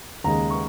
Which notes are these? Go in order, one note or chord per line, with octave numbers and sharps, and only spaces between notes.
D#2 C#3 G#3 A#5
C#6